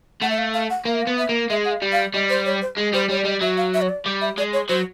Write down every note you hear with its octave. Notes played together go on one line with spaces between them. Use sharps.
A3 F#5
E5
F5
F5
F#5
A#3 F5
E5
F5
B3
E5
A#3
G#3 E5
F#5
F5
G3
F5
G3 D#5
C5
C#5
C5
G#3
G3 C5
G3 C#5
D5
G3 D#5
F#3 E5
F5
E5
C#5
D5
G3
E5
G#3 D5
C#5
F#3 C5